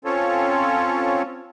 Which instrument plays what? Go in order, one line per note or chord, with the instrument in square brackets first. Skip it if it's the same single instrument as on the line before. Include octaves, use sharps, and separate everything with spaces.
[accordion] C4 C#4 F4 A4 C#5